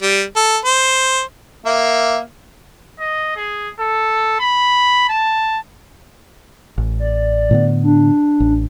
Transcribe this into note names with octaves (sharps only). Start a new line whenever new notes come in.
G3
A4
C5
A#3 E5
D#5
G#4
A4
B5
A5
A1
D5
A2 D3 B3
D4
A1